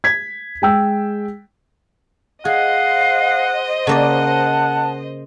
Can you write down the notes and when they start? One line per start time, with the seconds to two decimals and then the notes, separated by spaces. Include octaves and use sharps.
0.04 G#6 B6
0.62 G#3 G5 E6
2.45 G#4 C5 D#5 F5 F#5
3.87 C#3 A#3 D5 F#5 A5